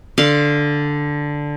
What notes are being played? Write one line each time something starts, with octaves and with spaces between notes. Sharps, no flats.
D3 F5 C6